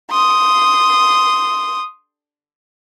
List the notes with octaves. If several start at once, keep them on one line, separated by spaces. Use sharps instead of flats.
C6 D#6